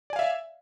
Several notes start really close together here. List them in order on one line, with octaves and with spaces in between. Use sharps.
D5 G#5 F5 E5